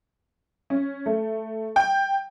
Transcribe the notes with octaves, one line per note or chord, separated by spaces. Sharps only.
C#4
A3
G5